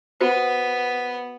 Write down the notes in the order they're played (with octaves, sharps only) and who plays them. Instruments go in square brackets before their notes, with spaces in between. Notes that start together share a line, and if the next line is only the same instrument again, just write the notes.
[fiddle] B3 [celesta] F#4 C5